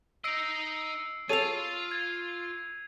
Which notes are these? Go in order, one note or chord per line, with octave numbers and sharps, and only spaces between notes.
D#4 D#5 E6 C7 D7
F4 G#4 A4 C#5 D#7 F7
G#6